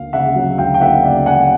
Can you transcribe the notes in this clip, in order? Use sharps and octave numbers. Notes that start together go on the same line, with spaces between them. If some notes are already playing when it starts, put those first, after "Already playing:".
Already playing: D2 A#3 F5
C#3 E5 F#5
F#3
D2 F5 G5
G5
A#3 E5 F#5
C#3 D5 E5
F#3 F#5 G#5